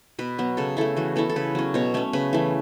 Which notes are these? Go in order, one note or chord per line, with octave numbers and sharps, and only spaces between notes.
B2 B4
F#3 B3
C#3 A4
A3 E4 A4
E3 F#4
B3 E4 A4
A4
C#3 B4
F#3 C#4
B2 C#5
A3 C#4 C#5
C#3 B4
E3 A3